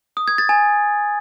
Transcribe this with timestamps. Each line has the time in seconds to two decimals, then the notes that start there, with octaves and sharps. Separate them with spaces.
0.17 D#6
0.28 G#6
0.38 A6
0.49 G#5